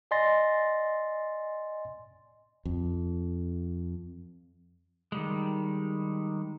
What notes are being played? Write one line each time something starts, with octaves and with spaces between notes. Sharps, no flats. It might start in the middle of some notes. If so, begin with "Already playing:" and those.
D5 D#5 G#5 C6 A6 A#6
F2
D#3 G3 G#3